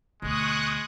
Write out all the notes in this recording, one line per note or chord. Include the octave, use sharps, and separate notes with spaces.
D2 B2 G#3 C#6 D#6 F#6